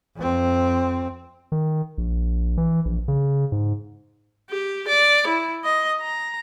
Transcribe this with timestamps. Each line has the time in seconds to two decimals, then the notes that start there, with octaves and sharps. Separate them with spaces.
0.16 F2 C4
1.52 D#3
1.98 A#1
2.57 E3
2.85 A#1
3.08 C#3
3.52 G#2
4.50 G4
4.88 D5
5.28 E4
5.65 D#5
6.00 A#5